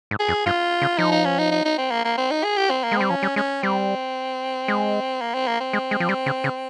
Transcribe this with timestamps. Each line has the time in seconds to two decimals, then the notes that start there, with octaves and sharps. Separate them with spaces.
0.11 G#2
0.20 G#4
0.28 F2
0.46 G2 F4
0.82 C#3
0.98 F3 D#4
1.12 D#4
1.25 C#4
1.38 D#4
1.52 D#4
1.65 D#4
1.78 C4
1.91 A#3
2.04 A#3
2.17 C4
2.31 D#4
2.44 G#4
2.57 G4
2.70 C4
2.83 A#3
2.92 G#3
2.97 G3 C4
3.09 F3 C#4
3.23 G3
3.36 G#3 C#4
3.63 G3 C4
4.68 G#3
5.21 A#3
5.34 C4
5.47 A#3
5.60 C4
5.73 G#3
5.91 G#3
6.00 F3
6.09 G3
6.26 C#3
6.44 C#3